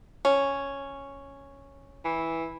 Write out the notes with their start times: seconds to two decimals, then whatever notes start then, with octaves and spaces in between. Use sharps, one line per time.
0.25 C#4
2.05 E3